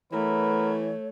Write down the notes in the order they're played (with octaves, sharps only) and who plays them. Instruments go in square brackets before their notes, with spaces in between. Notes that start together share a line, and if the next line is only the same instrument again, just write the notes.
[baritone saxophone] E3 [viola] A3 [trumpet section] B3 A#4 B4 [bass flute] C#5